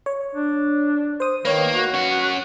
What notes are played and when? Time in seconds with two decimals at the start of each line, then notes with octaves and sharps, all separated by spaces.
0.06 C#5
0.35 D4
1.20 C5 D#6
1.45 D#3 A#3 B4 C#5
1.74 F#4
1.94 C#4 F#5